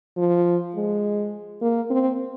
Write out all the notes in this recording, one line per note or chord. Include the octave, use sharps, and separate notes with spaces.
F3
G#3
A#3
C4